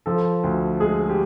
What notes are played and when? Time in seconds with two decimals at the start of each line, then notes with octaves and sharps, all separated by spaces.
0.06 F3 A4
0.43 D2
0.80 G#3 G#4
1.09 G4